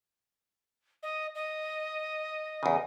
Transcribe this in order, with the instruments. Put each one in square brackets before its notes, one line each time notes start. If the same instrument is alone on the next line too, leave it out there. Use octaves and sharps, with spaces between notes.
[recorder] D#5
D#5
[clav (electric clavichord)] E2 C#3